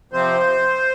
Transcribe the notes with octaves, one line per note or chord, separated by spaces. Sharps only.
C3 F3 C4 C5